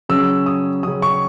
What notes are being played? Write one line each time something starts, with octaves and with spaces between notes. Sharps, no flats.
C#3 F#3 C#4 E6
D#6
C#3 F#3 C#4 D#6
C#6